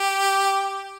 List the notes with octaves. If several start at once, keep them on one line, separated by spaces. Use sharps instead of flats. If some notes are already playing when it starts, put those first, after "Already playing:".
Already playing: G4